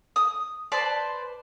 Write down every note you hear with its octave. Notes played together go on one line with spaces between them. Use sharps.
D#6
B4 C5 D5 A5